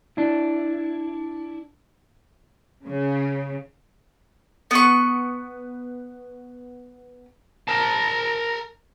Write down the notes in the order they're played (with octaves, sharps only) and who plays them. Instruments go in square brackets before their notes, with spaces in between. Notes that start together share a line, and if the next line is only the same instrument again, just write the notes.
[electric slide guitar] D4 E4
[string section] C#3
[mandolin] B3 C#6
[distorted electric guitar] A#4 A5